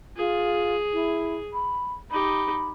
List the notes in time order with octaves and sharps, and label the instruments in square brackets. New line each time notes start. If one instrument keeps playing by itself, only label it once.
[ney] F4 [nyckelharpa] G#4
[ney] E4
B5
[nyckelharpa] D#4 G4 [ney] B5